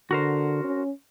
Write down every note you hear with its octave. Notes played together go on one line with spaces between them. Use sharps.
D3 F#4 A#4 C5
C#4